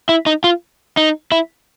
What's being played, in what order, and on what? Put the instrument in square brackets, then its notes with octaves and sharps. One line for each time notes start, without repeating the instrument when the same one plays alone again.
[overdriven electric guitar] E4
D#4
F4
D#4
E4